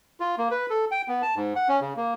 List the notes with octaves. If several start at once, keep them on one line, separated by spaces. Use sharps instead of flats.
F4
A#3
B4
A4
G5
B3
A5
G#2
F#5
C#4
C#3
A#3